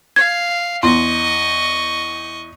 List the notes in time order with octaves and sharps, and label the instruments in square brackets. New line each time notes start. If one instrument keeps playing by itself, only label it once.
[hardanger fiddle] F5 [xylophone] G#6
[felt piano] E2 [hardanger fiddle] D#5 C#6 [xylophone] C6